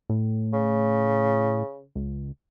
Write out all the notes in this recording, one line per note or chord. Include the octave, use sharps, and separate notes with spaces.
A2
C#3
C#2